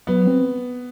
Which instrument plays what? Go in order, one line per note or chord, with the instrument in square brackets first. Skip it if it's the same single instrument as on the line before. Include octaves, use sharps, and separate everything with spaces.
[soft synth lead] F#3 [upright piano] B3
[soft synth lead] C4